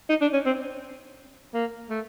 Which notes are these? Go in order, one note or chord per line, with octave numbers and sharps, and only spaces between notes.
D#4
D4
C#4
C4
A#3
A3